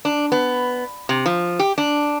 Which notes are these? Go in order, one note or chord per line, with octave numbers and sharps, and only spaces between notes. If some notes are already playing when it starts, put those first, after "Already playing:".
D4
B3
C3
F3
G4
D4